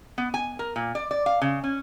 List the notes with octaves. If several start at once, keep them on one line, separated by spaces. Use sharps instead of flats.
B3
G#5
A#4
A#2
D5
D5
F5
C#3
C#4